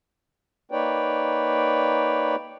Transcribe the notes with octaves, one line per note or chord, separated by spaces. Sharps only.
A#3 D#4 B4 C#5 D5 G5